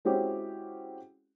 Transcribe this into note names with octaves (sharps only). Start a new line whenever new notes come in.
G#3 C4 C#4 E4 F#4 G4